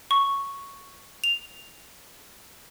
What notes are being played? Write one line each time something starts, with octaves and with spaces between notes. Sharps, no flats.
C#6
F7